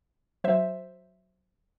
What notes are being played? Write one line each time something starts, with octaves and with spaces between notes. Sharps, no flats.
F#3 C5 E5